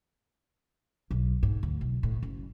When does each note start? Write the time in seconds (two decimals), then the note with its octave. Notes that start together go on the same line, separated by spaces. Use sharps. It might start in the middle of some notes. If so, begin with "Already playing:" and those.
1.11 B1
1.43 G#2
1.63 D2
1.81 B1
2.03 A2
2.23 F#1